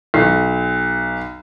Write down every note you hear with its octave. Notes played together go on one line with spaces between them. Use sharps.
B1